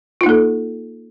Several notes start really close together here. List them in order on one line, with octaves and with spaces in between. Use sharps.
F4 D#4 A#3 A4